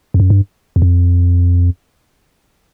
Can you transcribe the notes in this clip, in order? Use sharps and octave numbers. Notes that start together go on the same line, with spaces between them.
F2
F#2
G2
E2
F2